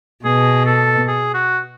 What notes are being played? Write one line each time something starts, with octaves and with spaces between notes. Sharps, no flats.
B2 G#4
A4
G#4
F#4